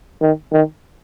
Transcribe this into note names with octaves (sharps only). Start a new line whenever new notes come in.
D#3
D#3